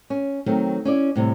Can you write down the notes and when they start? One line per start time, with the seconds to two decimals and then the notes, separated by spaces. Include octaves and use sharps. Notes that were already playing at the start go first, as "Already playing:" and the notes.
0.10 C#4
0.46 D#3 F#3 A3 C4
0.85 C#4 E4 D5
1.15 A2 C3 G3